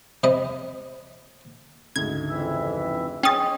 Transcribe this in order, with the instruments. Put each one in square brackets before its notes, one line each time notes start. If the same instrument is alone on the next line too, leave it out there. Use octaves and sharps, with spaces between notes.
[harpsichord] C3 G3 D#5 B5
[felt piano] D2 G#2 C#3 [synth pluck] G#6
[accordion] F2 E3 E5
[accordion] G#3 [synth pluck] C#4 A6 [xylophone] G5 D#6